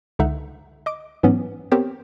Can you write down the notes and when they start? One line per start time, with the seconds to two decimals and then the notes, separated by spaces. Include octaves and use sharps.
0.19 C#2 D3 D#4 E5 F#5
0.86 D#5 D6 D7
1.23 G#2 E3 F#3 B3 C#4
1.72 B3 C4 G4 A#4 C5 C#5